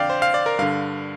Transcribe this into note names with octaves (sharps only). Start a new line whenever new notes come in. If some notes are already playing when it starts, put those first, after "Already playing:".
Already playing: F2 D3 D5 F5 G5
C5
F5
D5
A#4
G2 D3 F5